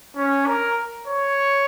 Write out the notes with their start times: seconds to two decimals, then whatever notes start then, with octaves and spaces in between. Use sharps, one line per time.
0.16 C#4
0.47 A#4
1.07 C#5